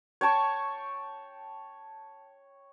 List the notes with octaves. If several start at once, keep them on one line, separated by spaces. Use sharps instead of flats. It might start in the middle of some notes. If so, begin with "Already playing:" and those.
C#5 G5 A5 C#6